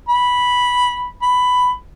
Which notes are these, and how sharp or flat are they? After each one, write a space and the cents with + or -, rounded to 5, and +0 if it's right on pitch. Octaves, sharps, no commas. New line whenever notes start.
B5 -5
B5 +10